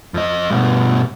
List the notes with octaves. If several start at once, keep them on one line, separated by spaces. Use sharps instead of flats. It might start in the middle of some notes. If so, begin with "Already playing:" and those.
F2 D#5
G2 B2